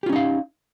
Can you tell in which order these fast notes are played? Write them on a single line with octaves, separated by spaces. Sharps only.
G4 F4 C#4 D#4 F5